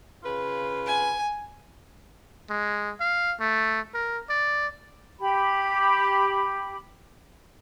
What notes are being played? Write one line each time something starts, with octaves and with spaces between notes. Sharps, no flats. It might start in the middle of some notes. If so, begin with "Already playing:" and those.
C#3 F4 B4
G#5
G#3
F5
A3
A#4
D5
G4 B5